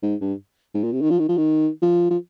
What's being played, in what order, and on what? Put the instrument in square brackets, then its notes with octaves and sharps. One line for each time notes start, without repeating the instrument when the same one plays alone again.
[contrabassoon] G#2
G2
G#2
A#2
C3
D#3
F3
D#3
F3
D#3
F3
F3